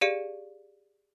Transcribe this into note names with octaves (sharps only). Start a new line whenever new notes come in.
G4 G#4 D5 F5 C#7 D#7